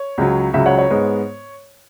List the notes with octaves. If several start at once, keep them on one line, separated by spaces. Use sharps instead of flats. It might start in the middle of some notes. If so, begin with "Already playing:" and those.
Already playing: C#5
C#2 C#3 F#3
C#2 C#3 F#3 E5
C#5 F#5
C#5
G#2 G#3 B3